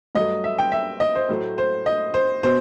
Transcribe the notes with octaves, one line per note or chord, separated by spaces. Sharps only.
G2 F#3 A3 D#5
E5
G5
E5
D#5
C5
A2 F#3 A3
C5
D#5
C5
B2 C5